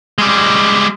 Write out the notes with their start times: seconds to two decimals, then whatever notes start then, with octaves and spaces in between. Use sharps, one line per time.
0.18 G3 G#3